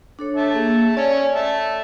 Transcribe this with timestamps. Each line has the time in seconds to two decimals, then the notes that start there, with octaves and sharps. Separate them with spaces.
0.19 D4 A4 C#5
0.36 E5 A5
0.54 A#3 G#4
0.97 C#4 C#5 D5
1.35 E5 A5